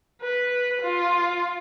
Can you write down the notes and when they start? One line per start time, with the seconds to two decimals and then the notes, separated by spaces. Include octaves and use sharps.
0.22 B4
0.82 F4